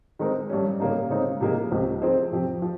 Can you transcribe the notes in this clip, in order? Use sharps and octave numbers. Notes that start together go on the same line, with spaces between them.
D#3 G#3 C4 D#4 A#4
G2 G3 C#4
C#3 G3 A#3 D#4
C#3 G#3 C4 D#4
C3 F3 A#3 D#4 G#4
C#2 C3 F3 C4
F3 C4 D#4 G#4 C5
F2 C3 F3 C4 G4
F3